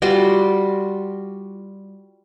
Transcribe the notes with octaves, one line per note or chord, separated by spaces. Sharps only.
G3 F4 F#4 C6